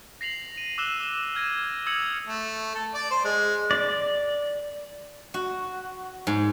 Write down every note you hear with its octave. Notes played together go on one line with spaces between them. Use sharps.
A#6 C7 F7 F#7
D#7
D6 E6 F#6 E7 G7
F6 G#6 A#6 D#7
D#6 E6 G#6 C#7 F#7
A3
A4
D5
C5
G#3
D5
F#4
G#2